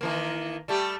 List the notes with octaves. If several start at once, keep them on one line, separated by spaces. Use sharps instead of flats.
D#3 E3 A#3
G3 A3 G4